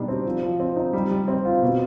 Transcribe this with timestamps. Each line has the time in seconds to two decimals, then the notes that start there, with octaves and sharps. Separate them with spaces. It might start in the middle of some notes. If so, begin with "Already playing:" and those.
Already playing: B2 G3 D4 D#4
0.08 C4
0.26 F3
0.43 F3
0.60 C4
0.76 D#4
0.93 G3
1.11 G3
1.28 C4
1.45 F4
1.62 B2